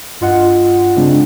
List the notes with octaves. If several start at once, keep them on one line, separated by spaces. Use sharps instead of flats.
G2 F4 D#5 F#5
C#3 G#3 C4 D4